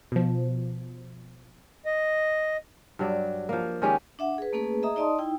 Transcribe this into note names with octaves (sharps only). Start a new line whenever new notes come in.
B2 F3
D#5
G2 F#3 D5
F3 A#3
D#3 G#3 C#4 G4
D4 E5 F#5
G#4 B4
A3 A#3 C#4 G#4 B4
G#4 D#5 E5 A#5 D#6
D#4 D5 D#5 A5 C6 D#6
D#4 E4 G5